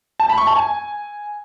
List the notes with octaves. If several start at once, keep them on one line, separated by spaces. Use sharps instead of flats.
A5
B5
C#6
A5
G#5